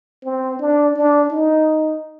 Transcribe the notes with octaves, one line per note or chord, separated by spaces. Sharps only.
C4
D4
D4
D#4